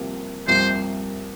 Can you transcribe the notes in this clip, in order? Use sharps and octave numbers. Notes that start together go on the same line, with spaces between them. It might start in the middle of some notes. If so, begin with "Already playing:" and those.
Already playing: C2 C3 F3 A#3
C2 C3 F3 A#3 C5